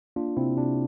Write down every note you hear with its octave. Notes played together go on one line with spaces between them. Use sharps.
A#3 D4 F4
C3 C4 E4
C3 D4